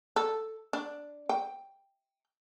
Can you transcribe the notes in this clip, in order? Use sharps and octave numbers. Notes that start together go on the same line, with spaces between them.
A4
D4
G5